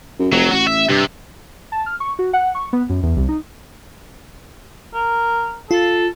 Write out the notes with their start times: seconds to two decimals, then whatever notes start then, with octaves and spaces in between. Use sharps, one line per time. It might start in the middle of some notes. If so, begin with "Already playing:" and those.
0.19 F#2
0.32 F1 F#3
0.51 A1 F#4
0.67 E5
0.89 G2 C3
1.72 A5
1.86 F6
2.00 C#6
2.19 F#4
2.33 F#5
2.55 C#6
2.73 B3
2.89 F#2
3.03 E2
3.16 C2
3.28 D#4
4.94 A#4
5.71 F4 A4